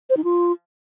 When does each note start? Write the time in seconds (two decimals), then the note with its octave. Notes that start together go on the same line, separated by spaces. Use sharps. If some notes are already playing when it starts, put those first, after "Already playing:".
0.10 C5
0.17 D#4
0.24 F4